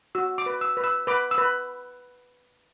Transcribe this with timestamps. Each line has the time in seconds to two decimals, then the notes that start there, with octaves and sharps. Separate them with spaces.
0.15 F#4 E6
0.38 D6
0.46 B4
0.61 E6
0.77 B4
0.84 E6
1.07 B4 D6
1.31 E6
1.38 B4